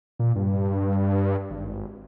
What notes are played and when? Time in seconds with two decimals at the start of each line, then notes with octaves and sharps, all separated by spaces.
0.19 A#2
0.35 G2
1.50 G#1